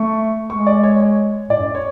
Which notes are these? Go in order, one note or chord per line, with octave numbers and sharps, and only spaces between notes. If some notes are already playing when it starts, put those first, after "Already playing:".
Already playing: A3 C#6
G#3 C#6
D5
C#5
C#5
A2 D5
F#2
C#5